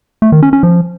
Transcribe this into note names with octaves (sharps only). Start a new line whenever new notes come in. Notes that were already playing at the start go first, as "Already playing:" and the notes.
A3
D#3
C#4
C#4
F3